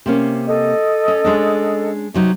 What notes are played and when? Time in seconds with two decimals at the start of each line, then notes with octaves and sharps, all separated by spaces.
0.06 C3 A#3 C#4
0.46 A4 D#5
1.08 C#4
1.24 G#3 C#4 D4
2.14 C3 F#3 D#4